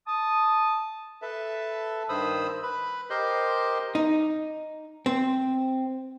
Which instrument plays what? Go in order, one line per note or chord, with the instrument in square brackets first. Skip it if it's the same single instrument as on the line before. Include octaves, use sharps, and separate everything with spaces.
[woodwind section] A5 D#6
[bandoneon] A4 B4 E5 A5
G2 D#3 C5 B5 D#6 E6
B4 B5
G4 A#4 C5 D#5 C6 G6
[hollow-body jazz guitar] D#4
C4